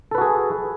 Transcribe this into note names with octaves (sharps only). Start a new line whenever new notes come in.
F#4 G#4 A4 B4